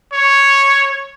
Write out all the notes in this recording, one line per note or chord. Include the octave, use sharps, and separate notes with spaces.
C#5